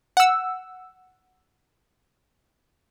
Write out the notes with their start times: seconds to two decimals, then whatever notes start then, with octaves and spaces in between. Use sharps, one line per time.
0.17 F#5 E6